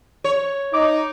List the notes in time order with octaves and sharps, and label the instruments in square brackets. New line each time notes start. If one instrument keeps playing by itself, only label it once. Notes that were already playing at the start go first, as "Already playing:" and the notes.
[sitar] C#5
[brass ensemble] D#4 [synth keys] D6